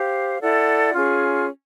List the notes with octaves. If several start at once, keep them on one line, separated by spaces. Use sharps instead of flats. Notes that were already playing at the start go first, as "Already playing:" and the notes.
Already playing: G4 C5 F5
E4 A4 D5 F#5
C#4 F4 G#4